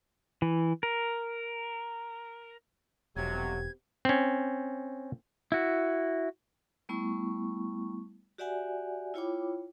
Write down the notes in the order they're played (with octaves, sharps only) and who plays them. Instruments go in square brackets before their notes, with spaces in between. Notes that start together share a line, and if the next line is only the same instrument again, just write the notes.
[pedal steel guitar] E3
A#4
[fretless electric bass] E1 [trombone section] F2 C3 F#3 [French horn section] B3 C4 G4 [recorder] G#6
[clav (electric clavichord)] C4 C#4
[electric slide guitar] E4 F#4
[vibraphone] G3 A3 B3 E4 C#6
F#4 G4 D5 E5 F#5 G#5
E4 F4 C#5 G5 B5 D6